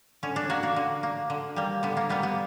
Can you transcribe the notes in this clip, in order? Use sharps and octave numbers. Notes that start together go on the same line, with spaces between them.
D3 C#4
D4
A#3 F#4
A#3
D3
A#3
D3
G3 A#3
D3 B3
A#3
G3 A#3 B3
B3